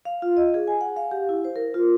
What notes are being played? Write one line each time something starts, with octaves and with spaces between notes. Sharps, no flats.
F5
F4
D#5
G#4
G#5
F#5
F5
G4
E4
C5
A#4
F4